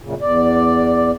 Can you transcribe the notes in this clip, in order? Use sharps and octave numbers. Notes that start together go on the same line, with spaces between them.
F#2 A#2 C#3
E2 D5